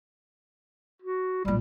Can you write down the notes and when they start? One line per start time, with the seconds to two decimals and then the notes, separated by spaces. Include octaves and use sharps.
1.02 F#4
1.45 B1 A#2 G3